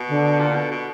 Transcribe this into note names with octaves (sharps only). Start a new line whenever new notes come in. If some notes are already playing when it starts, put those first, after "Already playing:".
Already playing: B2
D3
A#2
B2
B2